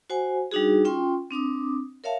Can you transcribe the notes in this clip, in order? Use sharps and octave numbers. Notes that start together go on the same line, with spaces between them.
F#4 C5 F#5 G#5
G3 D4 D#4 F#4 G#4
C#4 F4 G5 C6
C4 D4 D6 D#6
A#4 C#5 E5 F5 A5